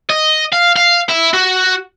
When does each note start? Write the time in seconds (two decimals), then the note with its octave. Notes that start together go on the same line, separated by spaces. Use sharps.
0.10 D#5
0.52 F5
0.76 F5
1.09 E4
1.34 F#4